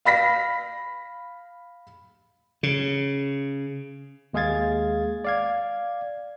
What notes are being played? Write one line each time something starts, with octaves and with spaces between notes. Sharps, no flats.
F5 B5 A#6 B6
C#3
D#2 G#3 G#4 F5 G#6 A6
D5 F5 G#6